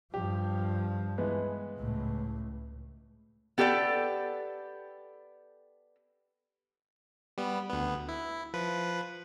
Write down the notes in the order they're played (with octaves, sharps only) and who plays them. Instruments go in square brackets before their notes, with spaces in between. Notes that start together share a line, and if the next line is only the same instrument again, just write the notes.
[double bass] G2 F3 [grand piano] G4
[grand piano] E3 G#3 B3
[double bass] C#2 A2
[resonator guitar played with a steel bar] B3 G4 A4 C5 D5
[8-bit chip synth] G3 B3
D2 B3
E4
F3 B4